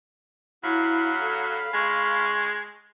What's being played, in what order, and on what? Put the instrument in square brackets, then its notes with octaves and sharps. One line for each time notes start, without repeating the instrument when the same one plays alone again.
[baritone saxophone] F#3 [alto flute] E4 [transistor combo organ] F5 B5
[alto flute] A4
[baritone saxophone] G#3 [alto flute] C#6